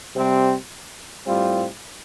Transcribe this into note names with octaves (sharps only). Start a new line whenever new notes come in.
C3 G3 C4
A2 G3 C4 F4